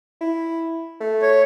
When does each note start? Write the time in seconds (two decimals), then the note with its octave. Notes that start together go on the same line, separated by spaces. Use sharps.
0.21 E4
1.00 A3
1.22 C#5